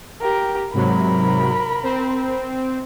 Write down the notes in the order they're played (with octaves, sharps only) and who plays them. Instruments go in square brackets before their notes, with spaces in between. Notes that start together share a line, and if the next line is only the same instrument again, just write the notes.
[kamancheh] G4 A#4
[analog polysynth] G#2 C3 F#3 [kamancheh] A#4 B5
[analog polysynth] C4